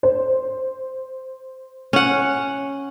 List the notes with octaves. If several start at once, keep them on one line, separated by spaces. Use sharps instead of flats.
C5
C#4 F#5